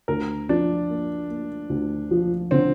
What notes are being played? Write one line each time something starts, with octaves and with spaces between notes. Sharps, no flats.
D2 A#4
F3 D4
A#3
A#3
D2
F3
D3 C4